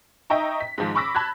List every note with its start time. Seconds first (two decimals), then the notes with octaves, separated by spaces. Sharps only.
0.30 D#4 D#5 E5 G5 A#5 C#6
0.60 B6
0.78 G#2 D#3 F3 G#3
0.95 B5 C#6 D6 E6 A#6 B6
1.15 A5 B5 F#6 G#6